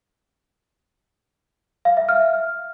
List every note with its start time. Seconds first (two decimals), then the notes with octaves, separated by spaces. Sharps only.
1.85 F5
1.97 E5
2.09 F6